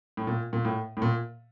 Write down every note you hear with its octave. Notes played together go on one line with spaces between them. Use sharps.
A2
A#2
A#2
A2
A2
A#2